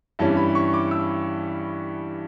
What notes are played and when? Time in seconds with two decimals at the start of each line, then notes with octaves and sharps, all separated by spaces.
0.19 G2 E3 G3 C#4 A5
0.37 B5
0.55 C#6
0.74 D6
0.91 E6